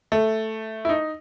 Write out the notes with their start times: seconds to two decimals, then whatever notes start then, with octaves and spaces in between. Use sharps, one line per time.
0.12 A3
0.85 E4
0.89 D#4